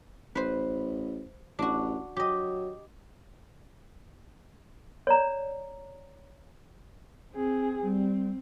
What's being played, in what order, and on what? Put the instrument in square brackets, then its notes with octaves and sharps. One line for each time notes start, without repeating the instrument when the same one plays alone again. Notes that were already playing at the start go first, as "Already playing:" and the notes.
[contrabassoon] A1 [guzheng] B4 C5
[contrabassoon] A1 [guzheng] D4 F#4
[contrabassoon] F#3 [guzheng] G4 D#5
[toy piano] C#5 D5 A#5
[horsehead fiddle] C4 G#4
[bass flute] G3 [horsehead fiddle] C4